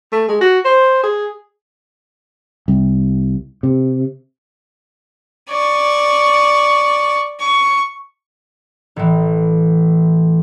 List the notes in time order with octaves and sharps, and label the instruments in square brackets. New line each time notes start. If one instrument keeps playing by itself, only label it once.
[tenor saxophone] A3
G#3
F#4
C5
G#4
[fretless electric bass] C2
C3
[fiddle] D5 C#6
C#6
[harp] A1 E3